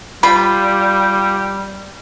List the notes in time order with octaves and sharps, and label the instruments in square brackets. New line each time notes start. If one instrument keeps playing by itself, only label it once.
[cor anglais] G3 [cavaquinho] F4 B5